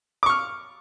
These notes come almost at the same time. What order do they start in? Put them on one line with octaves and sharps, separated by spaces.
D6 C#6 F6